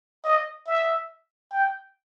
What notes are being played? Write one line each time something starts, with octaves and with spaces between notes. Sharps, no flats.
D#5
E5
G5